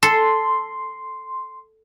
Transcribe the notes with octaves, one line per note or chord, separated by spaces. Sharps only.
A4 C6